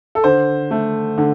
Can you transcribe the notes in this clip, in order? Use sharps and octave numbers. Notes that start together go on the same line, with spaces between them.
A4
D3 C5
A3
D3